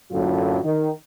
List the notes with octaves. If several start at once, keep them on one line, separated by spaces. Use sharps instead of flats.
F#2 A2 D3 F#3 A#3 F4
D#3